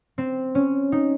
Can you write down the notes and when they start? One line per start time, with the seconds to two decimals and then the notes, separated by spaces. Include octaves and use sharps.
0.18 C4
0.55 C#4
0.92 D#4